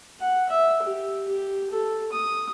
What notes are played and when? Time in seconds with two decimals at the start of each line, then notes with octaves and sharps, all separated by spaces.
0.20 F#5
0.49 E5
0.83 G4
1.28 G4
1.70 A4
2.12 D#6